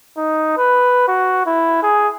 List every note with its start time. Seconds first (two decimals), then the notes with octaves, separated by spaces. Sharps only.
0.17 D#4
0.57 B4
1.08 F#4
1.46 E4
1.83 G#4